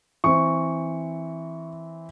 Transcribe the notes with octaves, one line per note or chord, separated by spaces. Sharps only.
E3 C4 C#6